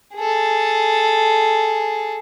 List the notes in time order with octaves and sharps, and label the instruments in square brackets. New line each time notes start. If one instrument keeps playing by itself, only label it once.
[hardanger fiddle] G#4 A4